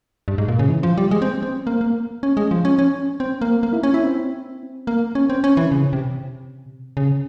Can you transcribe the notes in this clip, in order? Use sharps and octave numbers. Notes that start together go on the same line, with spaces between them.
G2
G#2
A#2
C#3
E3
F3
G3
G#3
C4
C4
A#3
A#3
C#4
G#3
F3
C#4
C#4
C4
A#3
A#3
E4
C#4
E4
C4
A#3
C#4
C4
C#4
E3
C#3
C3
C#3